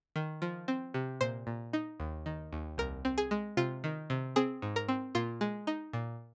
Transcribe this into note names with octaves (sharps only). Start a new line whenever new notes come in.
D#3
F3
C4
C3
A#2 C5
A#2
D#4
D#2
D#3
D#2
C2 A#4
C4
G#4
G#3
C3 F4
D#3
C3
C4 G#4
G#2
A#4
C4
A#2 F4
G#3
D#4
A#2